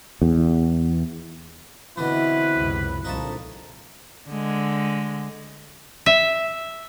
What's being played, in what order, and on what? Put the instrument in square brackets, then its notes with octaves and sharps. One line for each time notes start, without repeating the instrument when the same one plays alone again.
[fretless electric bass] E2
[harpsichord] B2 D3 E3 [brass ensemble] C4 E4 [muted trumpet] B4
[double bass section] C#2 F#2 C3
[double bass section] C2 A#2 D3 [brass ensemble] F3 [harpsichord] D#4 C#5 A5
[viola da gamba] D3 G#3
[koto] E5